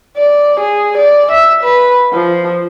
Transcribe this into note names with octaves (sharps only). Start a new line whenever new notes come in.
D5
G#4
D5
E5
B4
F3